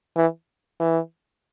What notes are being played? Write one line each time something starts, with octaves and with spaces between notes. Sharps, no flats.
E3
E3